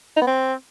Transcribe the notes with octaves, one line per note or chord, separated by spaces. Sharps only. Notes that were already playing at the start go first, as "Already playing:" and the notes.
D#4
B3
C4